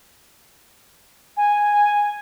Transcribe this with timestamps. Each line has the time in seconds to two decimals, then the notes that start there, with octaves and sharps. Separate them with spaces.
1.37 G#5